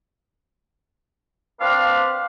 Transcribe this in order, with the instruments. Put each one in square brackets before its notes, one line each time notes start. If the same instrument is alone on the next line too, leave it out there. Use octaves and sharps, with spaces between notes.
[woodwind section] C4 D4 B4 F5